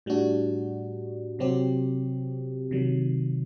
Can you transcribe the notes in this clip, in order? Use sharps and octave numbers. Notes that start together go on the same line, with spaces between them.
A2 G3 D4 F#4
C3 F#3 C4 G4
C3 D#3 F#3